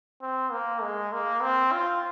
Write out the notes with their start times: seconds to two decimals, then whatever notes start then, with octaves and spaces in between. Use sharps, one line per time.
0.22 C4
0.51 A#3
0.82 G#3
1.13 A#3
1.42 C4
1.72 F4